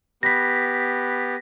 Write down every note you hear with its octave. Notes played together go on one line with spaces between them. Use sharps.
B3 G4 B4 A#6 B6